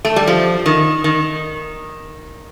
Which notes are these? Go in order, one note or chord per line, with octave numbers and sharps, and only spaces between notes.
A3
G3
F3
D#3
D#3